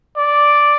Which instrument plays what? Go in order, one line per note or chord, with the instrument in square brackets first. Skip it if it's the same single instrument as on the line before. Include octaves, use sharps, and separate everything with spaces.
[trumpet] D5